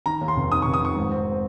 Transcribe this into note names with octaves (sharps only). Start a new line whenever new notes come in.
D#3 A#5
D#2
C6
F1
D#3 D#6
C#6
F1
D#6
D#3 C#6
G#2
C4